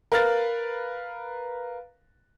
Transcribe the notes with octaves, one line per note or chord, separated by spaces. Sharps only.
A#4 B4 F5 F6 F#6 A6